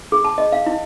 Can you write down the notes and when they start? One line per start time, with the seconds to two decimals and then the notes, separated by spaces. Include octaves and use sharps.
0.12 G#4
0.25 A5
0.38 D#5
0.52 F5
0.66 E4